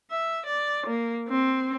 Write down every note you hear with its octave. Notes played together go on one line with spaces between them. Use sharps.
E5
D5
A#3
C4